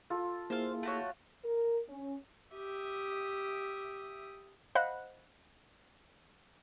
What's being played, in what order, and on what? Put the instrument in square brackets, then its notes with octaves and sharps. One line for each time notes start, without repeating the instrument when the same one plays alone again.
[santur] F4 A4
[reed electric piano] A#3 E4 G#4 [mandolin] C5 F5
[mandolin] A3 F#4 C#5
[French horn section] A#4
C#4
[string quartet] G4 E5 D#6
[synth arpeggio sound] C5 D#5 F5 F#5 B5 F#6